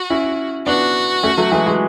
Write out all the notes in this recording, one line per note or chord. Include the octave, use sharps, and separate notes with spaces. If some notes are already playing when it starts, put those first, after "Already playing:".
Already playing: F#4
C#4 E4
B3 D4 F#4
A3 C#4
F#3 A3
E3 G#3
E3 G#3